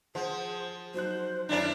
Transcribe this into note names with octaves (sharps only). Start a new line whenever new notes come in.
F3 G#4 C5 F#5
F#3 D#4 C5 F#6
F#2 D4 E4 A#4 C#5 D5 G#5